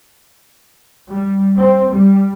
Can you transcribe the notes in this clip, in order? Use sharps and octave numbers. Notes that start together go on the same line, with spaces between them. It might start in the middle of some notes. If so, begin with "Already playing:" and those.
G3
C4
G3